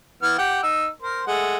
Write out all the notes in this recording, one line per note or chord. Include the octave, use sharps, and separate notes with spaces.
E3 B3 F6
G4 F#5 G5
D#4 E6
A#4 C5
G#3 A3 F#5